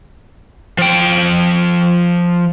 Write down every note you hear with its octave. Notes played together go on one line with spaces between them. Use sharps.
F3 G5